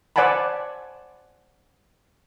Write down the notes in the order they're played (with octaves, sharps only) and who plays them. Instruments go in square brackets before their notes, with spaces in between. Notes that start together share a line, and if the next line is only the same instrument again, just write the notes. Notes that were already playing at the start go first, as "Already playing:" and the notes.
[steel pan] C5 D5 F#5 G#5 A5 B5